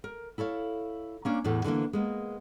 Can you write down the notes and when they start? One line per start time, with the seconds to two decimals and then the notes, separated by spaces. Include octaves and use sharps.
0.04 A#4
0.38 E4 A4 C#5 F5
1.25 A#3 C#4 D4
1.44 E2 A2 E3 A3
1.64 D3 E3 G3 A#3
1.93 G#3 A#3 B3